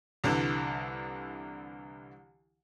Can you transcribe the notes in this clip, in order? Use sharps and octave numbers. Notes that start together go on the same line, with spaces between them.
C2 D3 E3